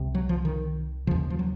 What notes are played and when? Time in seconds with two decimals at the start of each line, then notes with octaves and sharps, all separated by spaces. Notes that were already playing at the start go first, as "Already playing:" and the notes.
Already playing: C2 C3
0.15 F#3
0.29 F3
0.45 D#3
1.07 D#2 C#3 F3
1.30 F3
1.39 F#3